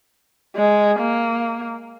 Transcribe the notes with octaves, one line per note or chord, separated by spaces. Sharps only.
G#3
A#3